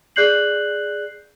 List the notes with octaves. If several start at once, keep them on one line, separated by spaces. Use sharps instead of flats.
G#4 D5 F#6 G6 C7 F#7